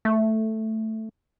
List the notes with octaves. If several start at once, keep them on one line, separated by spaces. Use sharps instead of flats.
A3